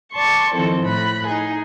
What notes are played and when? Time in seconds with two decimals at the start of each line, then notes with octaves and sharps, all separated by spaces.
0.13 D5 A5 C6 C#6
0.54 D#3 F3 C4 E4 A4
0.82 A2 B5 F#6
1.26 D#4 G#4